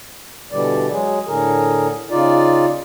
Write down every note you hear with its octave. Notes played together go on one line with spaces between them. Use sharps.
B2 D3 E3 G3 D5
F#3 G#3 G#4
A2 D3 G#4 A#4
C#3 D#4 F4 D5